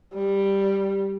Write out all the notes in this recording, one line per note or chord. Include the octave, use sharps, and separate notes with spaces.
G3